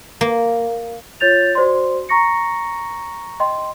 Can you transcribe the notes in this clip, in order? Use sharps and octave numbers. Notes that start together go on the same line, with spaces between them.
A#3
F4 C#5 G6 A6 F7
F#4 C5 D5 C6
A#5 C#6 A#6 C#7
D#5 G5 C6